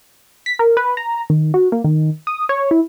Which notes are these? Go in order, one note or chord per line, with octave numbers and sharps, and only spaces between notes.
B6
A#4
B4
A#5
D#3
F#4
A#3
D#3
D#6
C#5
E4